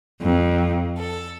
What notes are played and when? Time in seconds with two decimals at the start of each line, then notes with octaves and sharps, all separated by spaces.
0.22 F2
0.97 A4